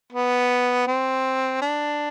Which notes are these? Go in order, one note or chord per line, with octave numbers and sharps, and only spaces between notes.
B3
C4
D4